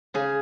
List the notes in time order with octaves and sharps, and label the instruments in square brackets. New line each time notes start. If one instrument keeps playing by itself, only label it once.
[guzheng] C#3 G#4